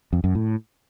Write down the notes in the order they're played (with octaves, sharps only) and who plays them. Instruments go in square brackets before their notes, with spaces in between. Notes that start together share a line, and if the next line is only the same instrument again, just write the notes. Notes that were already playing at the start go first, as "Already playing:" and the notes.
[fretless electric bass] F2
F#2
A2